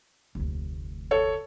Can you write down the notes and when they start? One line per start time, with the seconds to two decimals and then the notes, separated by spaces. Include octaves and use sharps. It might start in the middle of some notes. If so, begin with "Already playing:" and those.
0.35 F1 D2
1.11 A4 C#5